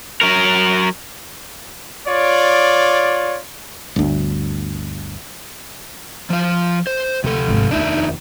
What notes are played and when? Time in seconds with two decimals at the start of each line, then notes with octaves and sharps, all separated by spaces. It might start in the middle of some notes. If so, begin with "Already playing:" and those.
0.21 F#3 A#4
2.07 F4 C#5 D5
3.96 G1 D2
6.30 F3 F5
6.87 C5
7.24 D2 C3 A4
7.48 G#1 D2
7.71 F1 D#2 D4 D#4 E5